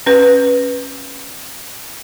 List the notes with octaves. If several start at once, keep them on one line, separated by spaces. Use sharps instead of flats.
C#4 B4